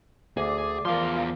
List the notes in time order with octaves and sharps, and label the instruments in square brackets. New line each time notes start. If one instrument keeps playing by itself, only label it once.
[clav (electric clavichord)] D2 [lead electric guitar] G#4 [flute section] D5 D6
[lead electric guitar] E2 C6 [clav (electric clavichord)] F3 [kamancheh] F4 A#4